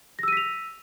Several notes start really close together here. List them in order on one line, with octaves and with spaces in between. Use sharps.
A#6 E6 D#7 B6 F7